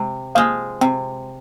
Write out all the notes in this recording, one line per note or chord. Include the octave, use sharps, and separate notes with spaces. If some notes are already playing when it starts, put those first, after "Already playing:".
Already playing: C3 G#3
F3 G#3 A#3
C3 C4